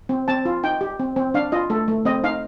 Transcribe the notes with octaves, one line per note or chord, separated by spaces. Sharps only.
C4
C4 A5
F4
D#4 G5
G4
C4
C4
D4 F5
F4 D#5
A3 A4
A3
C4 D#5
D#4 F5